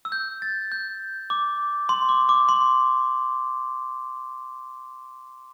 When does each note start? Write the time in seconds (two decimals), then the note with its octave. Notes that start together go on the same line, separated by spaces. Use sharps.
0.05 E6
0.12 G6
0.42 A6
0.72 G6
1.30 D6
1.89 C6
2.09 D6
2.29 D6
2.49 C6